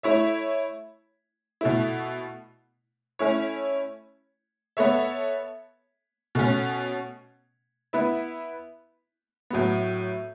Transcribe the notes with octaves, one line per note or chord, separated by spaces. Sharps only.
A3 E4 C#5 E5
B2 A3 E4
A3 C#4 E4 C#5
B3 A4 C#5 E5
B2 A3 C#4
B3 E4 B4 E5
A2 F#3 B3